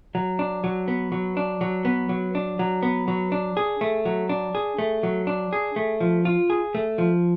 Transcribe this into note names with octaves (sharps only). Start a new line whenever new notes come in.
F#3
D4
F#3
B3
F#3
D4
F#3
B3
F#3
D4
F#3
B3
F#3
D4
G#4
A3
F#3
D4
G#4
A3
F#3
D4
G#4
A3
F3
F4
G#4
A3
F3